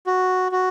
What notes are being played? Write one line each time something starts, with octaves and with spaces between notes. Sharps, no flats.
F#4
F#4